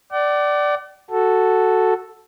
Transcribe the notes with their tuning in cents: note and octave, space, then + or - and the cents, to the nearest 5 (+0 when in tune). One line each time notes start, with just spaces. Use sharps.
D5 +0 F#5 +45
F#4 +0 A4 +0